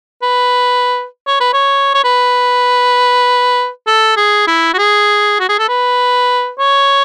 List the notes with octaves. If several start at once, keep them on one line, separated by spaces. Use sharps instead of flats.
B4
C#5
B4
C#5
C#5
B4
A4
G#4
E4
F#4
G#4
F#4
G#4
A4
B4
C#5